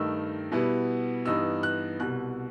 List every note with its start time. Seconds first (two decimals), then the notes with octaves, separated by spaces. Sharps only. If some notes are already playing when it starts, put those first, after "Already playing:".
Already playing: G2 D#3 A3 D#4 E6
0.52 B2 G3 B3 E4
1.26 G2 E3 G3 B3 D#4 E6
1.63 F#6
2.00 C2 B2 G3 F#6